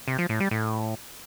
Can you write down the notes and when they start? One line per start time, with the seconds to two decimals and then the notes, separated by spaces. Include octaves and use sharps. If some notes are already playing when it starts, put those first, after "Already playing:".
0.08 C3
0.18 F3
0.29 A2
0.40 G3
0.51 A2